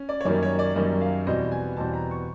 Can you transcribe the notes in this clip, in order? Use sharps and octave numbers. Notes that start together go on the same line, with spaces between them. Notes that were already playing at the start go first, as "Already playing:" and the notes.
Already playing: C#4
D5
C#5
F#2 D#3 G3 A#3 C#4 D5
C#5
D5
F#2 D#3 G3 A#3 C#4 D#5
F5
E2 B2 G3 C4 D#5
G#5
E2 B2 G3 C4 A5
A#5
C#6